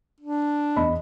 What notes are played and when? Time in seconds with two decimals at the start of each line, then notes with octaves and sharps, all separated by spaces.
0.20 D4
0.76 E2 D#5 B5